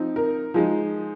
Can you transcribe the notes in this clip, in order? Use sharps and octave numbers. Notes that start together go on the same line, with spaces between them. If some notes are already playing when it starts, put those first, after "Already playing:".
Already playing: F3 C4 D#4
A#4
F3 G#3 D#4